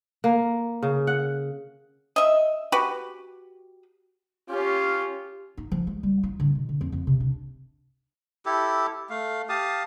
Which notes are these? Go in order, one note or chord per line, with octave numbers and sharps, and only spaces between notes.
A#3
C#3
F#5
D#5 E5
F#4 G4 B4
C#4 F4 G4
D#4
F3
G#3
G3
F4
D3
B2
D3
F2
F2
C3
D4
E4 G4 A4
A3 F5
G4 F5 A5 D#6